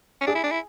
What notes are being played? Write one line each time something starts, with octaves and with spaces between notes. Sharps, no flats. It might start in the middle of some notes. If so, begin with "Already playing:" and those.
C#4
D4 G#4
E4
D4
E4